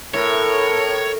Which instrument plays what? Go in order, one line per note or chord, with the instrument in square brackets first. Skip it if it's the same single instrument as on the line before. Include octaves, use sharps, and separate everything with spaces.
[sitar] A2 [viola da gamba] A#4 [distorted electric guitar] C#5